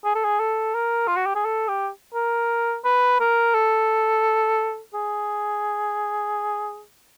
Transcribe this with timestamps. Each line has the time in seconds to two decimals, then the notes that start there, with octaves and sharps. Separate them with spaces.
0.05 G#4
0.15 A4
0.24 G#4
0.40 A4
0.74 A#4
1.07 F4
1.16 F#4
1.26 G4
1.35 G#4
1.45 A4
1.68 G4
2.14 A#4
2.85 B4
3.20 A#4
3.54 A4
4.94 G#4